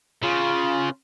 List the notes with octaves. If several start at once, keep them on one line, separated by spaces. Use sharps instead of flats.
C#3 F4